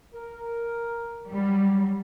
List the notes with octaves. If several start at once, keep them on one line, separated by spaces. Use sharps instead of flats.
A#4
F#3 G3